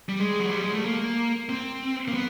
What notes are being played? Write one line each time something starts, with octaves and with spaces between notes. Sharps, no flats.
G3
G#3
F#3
G3
G#3
A3
A#3
C4
A#3
B3